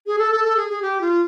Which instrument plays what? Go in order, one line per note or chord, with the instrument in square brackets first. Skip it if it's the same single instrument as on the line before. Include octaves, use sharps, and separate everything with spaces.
[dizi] G#4
A4
A4
A4
G#4
G#4
G4
F4